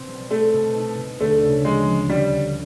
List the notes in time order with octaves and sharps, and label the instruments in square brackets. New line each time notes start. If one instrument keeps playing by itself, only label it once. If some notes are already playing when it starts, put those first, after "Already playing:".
Already playing: [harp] B2 C4
G3
[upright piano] A3 [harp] C4
[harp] B2
D#4
B2
[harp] D2 [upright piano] A3
[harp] C#3
[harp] F3 [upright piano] G#3
[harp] F3
[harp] D2 [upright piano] G3
[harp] D2